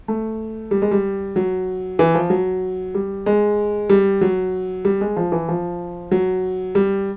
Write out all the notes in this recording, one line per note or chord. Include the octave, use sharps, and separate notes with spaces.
A3
G3
G#3
G3
F#3
E3
F3
F#3
G3
G#3
G3
F#3
G3
G#3
F3
E3
F3
F#3
G3